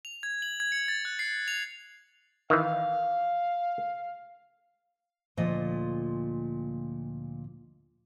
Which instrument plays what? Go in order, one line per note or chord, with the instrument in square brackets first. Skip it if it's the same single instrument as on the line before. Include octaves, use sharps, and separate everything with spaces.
[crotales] F7
G#6
F#7
G#6
C#7
A6
F#6
C7
F7
[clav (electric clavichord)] D#3 E3 [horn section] F5
[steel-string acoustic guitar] D2 A#2 F3 D#5